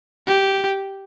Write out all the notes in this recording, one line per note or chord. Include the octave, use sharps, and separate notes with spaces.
G4